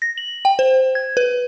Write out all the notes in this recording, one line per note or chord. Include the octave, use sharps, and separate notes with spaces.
A#6
F#7
G5
C5
G#6
B4